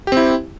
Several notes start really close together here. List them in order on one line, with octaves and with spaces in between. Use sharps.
G4 C4 E4